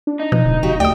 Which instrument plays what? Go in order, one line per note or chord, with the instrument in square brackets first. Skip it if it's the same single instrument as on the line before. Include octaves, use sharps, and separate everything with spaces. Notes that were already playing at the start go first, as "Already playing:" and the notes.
[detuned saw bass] D4
[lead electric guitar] D#4
[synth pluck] B2 [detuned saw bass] F3
[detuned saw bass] D1
[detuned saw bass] F1 [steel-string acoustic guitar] F#4 G4 F5
[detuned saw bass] D2 [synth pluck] D5 D#6 [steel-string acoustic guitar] G5